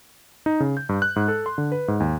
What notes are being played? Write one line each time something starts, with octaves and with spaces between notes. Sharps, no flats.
D#4
C#3
G6
G2
F#6
G#2
A4
C6
D3
B4
G#2
D#2